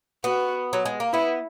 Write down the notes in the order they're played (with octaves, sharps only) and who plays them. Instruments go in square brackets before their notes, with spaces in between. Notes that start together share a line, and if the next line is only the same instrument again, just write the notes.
[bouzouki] B3 [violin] F#4
[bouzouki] F#3
G#3
A#3
[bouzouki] B3 [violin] E4